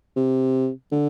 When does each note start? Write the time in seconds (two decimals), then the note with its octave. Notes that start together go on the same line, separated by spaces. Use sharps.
0.16 C3
0.92 D3